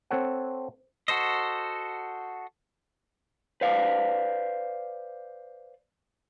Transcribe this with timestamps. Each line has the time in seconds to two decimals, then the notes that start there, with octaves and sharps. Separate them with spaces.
0.11 C4 A4 C#5 F#5
1.08 F#4 A4 C5 D#5
3.61 B4 C5 D5 F5